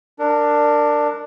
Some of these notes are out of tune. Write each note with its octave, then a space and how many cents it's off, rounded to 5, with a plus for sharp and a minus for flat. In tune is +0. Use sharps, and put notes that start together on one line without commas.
D4 +10 A#4 -20